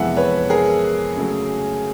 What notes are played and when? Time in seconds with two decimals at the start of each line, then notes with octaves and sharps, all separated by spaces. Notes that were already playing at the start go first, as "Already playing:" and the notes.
Already playing: F2 C3 E3 G#3 B3 E5 F#5
0.16 B4 C#5
0.50 G#4 A#4
1.15 C#3 F#3 A3